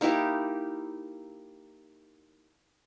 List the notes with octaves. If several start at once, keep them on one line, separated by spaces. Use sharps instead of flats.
A#3 D#4 E4 G4